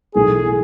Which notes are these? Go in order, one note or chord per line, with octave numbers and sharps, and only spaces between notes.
B1 A2 E3 A3 E4 G#4